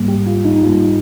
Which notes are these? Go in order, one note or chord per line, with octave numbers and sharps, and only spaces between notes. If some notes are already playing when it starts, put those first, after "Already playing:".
Already playing: G#2 G3 A#3
G4
F4
D#4
G#2 G3 A#3 F4